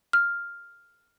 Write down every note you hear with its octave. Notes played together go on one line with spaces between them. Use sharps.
F6